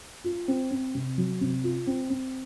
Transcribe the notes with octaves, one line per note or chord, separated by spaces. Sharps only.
F4
C4
C4
C3
F#3
C3
F4
C4
C4